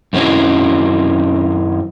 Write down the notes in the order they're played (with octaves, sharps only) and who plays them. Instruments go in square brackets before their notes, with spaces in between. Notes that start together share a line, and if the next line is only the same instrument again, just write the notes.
[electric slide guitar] F#2 D#3 F#3 C4 C#4 E4